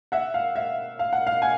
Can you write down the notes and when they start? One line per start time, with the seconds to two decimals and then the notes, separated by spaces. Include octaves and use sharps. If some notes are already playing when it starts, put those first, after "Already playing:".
0.12 E5 F#5
0.34 F5
0.56 E5
0.99 F5
1.13 F#5
1.27 F5
1.42 F#5 G#5